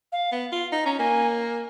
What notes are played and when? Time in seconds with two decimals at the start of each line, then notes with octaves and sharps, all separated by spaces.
0.12 F5
0.32 B3
0.52 F4
0.72 D#4
0.85 C#4 A#5
0.99 A#3 G#5